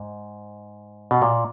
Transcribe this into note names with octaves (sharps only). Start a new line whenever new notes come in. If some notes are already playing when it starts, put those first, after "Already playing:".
Already playing: G#2
B2
A#2